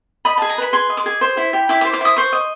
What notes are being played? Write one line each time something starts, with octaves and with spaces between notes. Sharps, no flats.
D#5 B5
G#4 A5
A#5
B4 B5
G#4 C6
D#5
D6
G#4
C5
E4
G4
E4 D6
D6
C5
D6
E4 D#6
C5 C#6
D#5